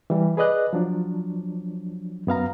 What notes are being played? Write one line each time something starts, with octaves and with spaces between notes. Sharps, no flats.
E3 G3
G#4 B4 D5 D#5 F#6
F3 F#3 D4
F#2 B3 F5 A#5